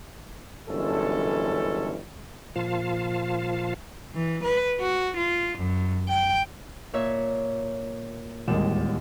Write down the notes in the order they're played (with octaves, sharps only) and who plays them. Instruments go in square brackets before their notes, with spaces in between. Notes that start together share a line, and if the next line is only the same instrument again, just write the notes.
[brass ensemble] G1 F#2 E3 G#3 C#4 A4
[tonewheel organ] A#2 F3 F4 F5 A5
[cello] E3
B4
F#4
F4
F#2
G5
[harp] A#2 C#5 E5
[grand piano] D1 D#2 E7 [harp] G3 G#3